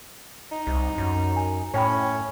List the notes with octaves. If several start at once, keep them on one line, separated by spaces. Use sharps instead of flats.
D#4
C2
F#2
G#5
A2 C#4 C#5 G5 B5